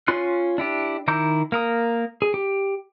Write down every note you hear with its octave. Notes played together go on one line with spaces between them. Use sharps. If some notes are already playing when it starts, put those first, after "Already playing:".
C#4 F4 C6 F#6
D4 E4 G4
D#3 E4 A#5 D6 G6
A#3 A#4 D#6
G#4
G4